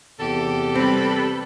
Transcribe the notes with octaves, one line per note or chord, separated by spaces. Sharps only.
E2 C3 G4 A4
G3 C4 B4 B5